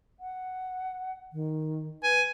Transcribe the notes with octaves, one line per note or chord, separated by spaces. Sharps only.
F#5
D#3
B4 G#5